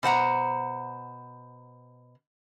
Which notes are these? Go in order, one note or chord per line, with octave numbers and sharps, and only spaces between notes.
B2 C5 F#5 A#5